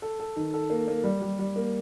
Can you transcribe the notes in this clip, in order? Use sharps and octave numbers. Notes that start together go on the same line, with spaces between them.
A4
A4
D#3
A4
A#3
A#3
G3
G3
G3
A#3